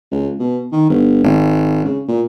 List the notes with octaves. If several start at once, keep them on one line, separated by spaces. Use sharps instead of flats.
C#2
B2
D#3
G1
G#1
C#3
A#2